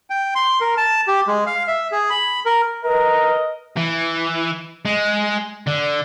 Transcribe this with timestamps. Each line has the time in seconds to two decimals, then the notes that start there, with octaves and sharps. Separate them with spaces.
0.10 G5
0.35 C6
0.61 A#4
0.77 A5
1.08 G4
1.28 G#3
1.47 F5
1.68 E5
1.92 G#4
2.10 B5
2.46 A#4
2.85 A#4 B4 D#5
3.77 E3
4.86 G#3
5.67 D3